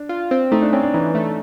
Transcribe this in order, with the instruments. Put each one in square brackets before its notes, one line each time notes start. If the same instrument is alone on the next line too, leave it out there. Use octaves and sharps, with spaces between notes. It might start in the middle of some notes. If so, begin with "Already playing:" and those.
Already playing: [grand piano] D4
[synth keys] F4
C4
[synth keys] A3 [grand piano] D#4
[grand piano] D4
[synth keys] C4 [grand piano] C#4
[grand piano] D4
[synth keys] E3 [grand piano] D#4
[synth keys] A3